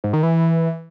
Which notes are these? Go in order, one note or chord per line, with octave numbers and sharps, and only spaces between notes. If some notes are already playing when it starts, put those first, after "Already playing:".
G#2
D#3
E3